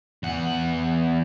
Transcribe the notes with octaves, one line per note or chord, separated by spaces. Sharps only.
E2 F#5